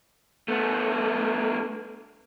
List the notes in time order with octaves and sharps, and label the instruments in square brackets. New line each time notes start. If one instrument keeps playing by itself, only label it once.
[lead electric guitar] A3 B3